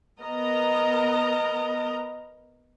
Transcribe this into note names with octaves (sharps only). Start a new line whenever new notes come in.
B3 A#4 D#5 A#5